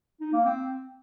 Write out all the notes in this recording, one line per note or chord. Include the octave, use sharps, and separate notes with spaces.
D#4
A#3
C4